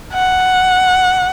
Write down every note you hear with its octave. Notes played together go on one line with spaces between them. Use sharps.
F#5